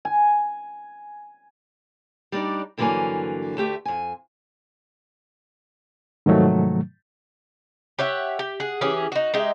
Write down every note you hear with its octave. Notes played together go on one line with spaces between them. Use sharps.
G#5
G3 D4 D#4 D5
G2 D3 E3 F#3 A#3 G#5
D2 A3 G4 E5
F2 G#5
G#2 C3 D#3 F3 F#3 A3
G4 C#5 E5 F#5
G4
G#4 F#5
E3 C#4 G4 G#4
D#4 F#4
G#3 D#4 G4 E5